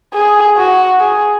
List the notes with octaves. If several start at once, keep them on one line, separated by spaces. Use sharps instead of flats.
G#4
F#4
G#4